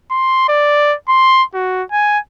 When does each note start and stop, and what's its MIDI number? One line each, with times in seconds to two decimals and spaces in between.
0.11 0.45 84
0.49 0.95 74
1.08 1.43 84
1.54 1.83 66
1.92 2.19 80